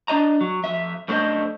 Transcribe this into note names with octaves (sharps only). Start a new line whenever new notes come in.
D4 D5 D#5 A#5
F#3
F2 E5
F#2 A3 D4 F#4 C5 D#5